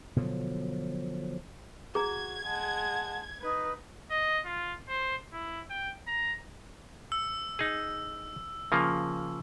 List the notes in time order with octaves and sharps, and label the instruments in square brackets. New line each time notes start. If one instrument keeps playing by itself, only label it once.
[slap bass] B2 D3 F3 F#3
[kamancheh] F#4 [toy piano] G#4 A#5 [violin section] G#6
[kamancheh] G#3 F#5 [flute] A5
[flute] D#4 [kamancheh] B4
[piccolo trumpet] D#5
F4
C5
E4
G5
A#5
[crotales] E6
[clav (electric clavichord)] D#4 G#4
C#3 F3 A#3